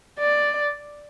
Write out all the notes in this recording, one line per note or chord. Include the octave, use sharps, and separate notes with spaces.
D5